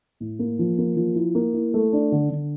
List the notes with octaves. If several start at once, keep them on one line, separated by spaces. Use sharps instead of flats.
A2
A#3
F3
A#3
F3
E4
A#3
E4
A3
D4
D3
D3